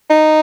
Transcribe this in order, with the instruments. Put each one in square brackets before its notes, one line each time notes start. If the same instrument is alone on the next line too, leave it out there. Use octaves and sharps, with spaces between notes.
[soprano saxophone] D#4